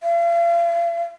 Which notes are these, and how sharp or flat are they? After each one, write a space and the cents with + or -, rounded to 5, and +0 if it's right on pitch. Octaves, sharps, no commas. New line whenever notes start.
F5 -40